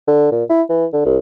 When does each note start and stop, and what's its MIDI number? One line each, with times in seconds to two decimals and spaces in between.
0.08 0.31 50
0.32 0.44 46
0.50 0.62 64
0.69 0.86 52
0.93 1.04 50
1.05 1.18 36